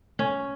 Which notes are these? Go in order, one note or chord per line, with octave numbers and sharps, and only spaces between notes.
C#4